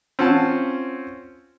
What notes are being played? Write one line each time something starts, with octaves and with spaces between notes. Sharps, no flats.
C4 C#4 F4 F#5 A5